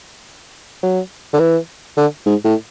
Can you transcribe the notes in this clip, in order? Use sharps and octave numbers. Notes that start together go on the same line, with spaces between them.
F#3
D3
E3
D3
G#2
A2